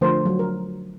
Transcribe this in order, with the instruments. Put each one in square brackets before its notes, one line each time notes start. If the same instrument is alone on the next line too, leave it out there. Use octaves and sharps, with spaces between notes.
[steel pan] D3 F3 A3 A#4 C5
F#3
A#4